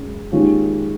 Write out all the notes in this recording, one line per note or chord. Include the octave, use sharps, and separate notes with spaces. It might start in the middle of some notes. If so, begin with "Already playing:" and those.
Already playing: F#2 G#3
D#2 D#3 G#3 C#4 F4